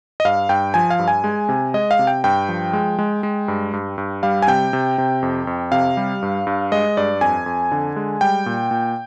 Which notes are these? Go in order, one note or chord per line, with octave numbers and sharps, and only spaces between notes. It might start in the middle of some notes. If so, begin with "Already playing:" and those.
D#5
G2 F5
G2 G5
F3 G#5
F5
G2
G#5
G#3
C3
G#3 D#5
F5
C3
G5
G2 G5
F3
G#3
G#3
G#3
G2
G2
G2
G3 F5
G#5
C3 G5
C3
C3
F2
F2
C3 F5
G3
G2
G2
G#3 D#5
G2 D5
F2 G#5
F2
D3
G#3
G3 G5
A#2
A#2